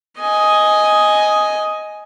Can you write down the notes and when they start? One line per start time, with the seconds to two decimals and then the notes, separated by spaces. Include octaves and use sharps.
0.19 D#5 G#5